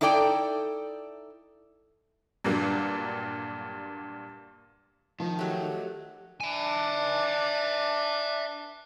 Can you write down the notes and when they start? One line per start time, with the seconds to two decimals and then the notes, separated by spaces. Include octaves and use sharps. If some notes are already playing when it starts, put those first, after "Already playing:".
0.01 D#4 E4 A4 D5 G5
2.44 G2 A#2 D3 F#3 G3 A#3
5.20 D#3 F3
5.39 F#3 A3 G4
6.40 D4 E5 G#5